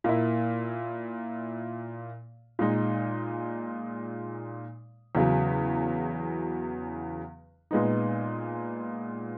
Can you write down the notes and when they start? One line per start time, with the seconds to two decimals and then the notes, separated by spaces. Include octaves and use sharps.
0.04 A#2 A#3 E4
2.59 A#2 G#3 D#4
5.15 E2 C#3 F#3
7.71 A#2 G#3 B3 D#4